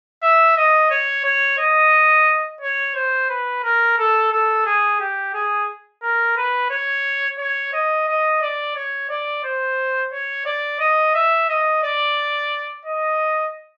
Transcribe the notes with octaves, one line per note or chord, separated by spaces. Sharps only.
E5
D#5
C#5
C#5
D#5
C#5
C5
B4
A#4
A4
A4
G#4
G4
G#4
A#4
B4
C#5
C#5
D#5
D#5
D5
C#5
D5
C5
C#5
D5
D#5
E5
D#5
D5
D#5